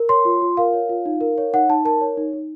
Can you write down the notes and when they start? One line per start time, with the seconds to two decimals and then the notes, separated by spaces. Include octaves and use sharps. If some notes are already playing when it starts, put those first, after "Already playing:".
Already playing: A#4
0.09 C#5 C6
0.25 F4
0.42 F4
0.57 A#4 F5
0.73 C#5
0.89 F4
1.06 D#4
1.21 A#4
1.38 C#5
1.53 D#4 F#5
1.69 D#4 A5
1.85 A#4 A5
2.01 C#5
2.17 D#4
2.33 D#4